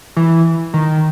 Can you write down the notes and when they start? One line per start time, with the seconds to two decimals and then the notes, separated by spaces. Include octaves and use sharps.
0.16 E3
0.74 D#3